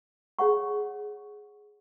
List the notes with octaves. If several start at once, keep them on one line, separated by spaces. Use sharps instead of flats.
G#4 C#5 F#5 C#6